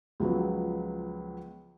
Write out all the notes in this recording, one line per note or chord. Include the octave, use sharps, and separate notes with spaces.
C#2 F3 F#3 B3